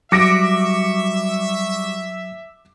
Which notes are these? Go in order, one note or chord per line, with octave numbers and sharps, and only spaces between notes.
F#3 G3 F#4 E5 D6 A#6 D7